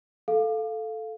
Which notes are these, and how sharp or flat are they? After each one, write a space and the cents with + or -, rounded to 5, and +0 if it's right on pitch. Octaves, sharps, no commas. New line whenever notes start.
A4 -5 F5 +0